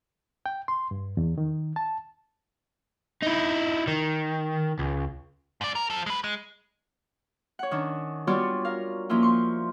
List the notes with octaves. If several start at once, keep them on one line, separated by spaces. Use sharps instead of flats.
G5
C6
G2
E2
D#3
A5
D#4 E4
D#3
C#2
G#2 D5
A#4
F3 A4
G#3 B4
G#3
C#5 F#5
D#3 C#4 D4
G3 B3 F4 F#4 C#5 D5
A#4 F5
F3 A#3 C#4 E4 F4
C6 C#6